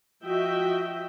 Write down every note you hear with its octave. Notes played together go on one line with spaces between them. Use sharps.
F3 F#4 D#5 E5 G5